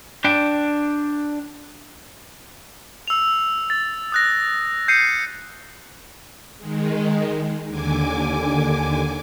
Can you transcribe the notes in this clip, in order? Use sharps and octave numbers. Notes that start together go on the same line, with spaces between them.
D4 G5
E6 F7
A6
D#6 F#6 A#6
G6 C7 C#7 D#7
D#3 G#3
D#2 D3 G#5 D6